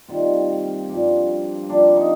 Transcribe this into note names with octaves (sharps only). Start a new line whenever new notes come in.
C3 D#3 G3 A#3 F4
G2 F3 A#3
C3 F3 A#3 D4
D#4